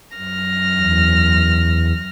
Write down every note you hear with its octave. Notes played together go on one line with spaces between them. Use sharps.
F#2 F6 A#6
E2